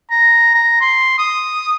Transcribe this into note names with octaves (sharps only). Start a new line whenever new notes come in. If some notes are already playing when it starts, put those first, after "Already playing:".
A#5
A#5
C6
D#6